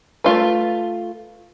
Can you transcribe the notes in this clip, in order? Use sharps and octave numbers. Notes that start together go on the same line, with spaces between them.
A3 F4 B4